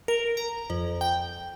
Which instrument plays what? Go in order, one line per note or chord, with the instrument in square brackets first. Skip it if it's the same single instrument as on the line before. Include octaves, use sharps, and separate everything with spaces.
[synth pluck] A#4
A#5
F2
G5